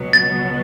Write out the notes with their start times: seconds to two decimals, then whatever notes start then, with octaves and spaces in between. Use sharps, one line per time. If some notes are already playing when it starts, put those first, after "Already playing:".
Already playing: C#2 B2 F#3 B3
0.13 A6